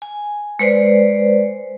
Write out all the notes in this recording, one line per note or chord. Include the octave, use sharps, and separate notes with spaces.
G#5
G#3 B4 C5 D5